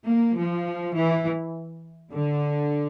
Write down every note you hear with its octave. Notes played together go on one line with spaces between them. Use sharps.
A#3
F3
E3
D3